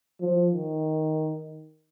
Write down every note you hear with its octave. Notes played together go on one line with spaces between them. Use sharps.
F3
D#3